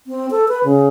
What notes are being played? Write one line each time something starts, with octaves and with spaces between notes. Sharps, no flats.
C4
A4
B4
C#3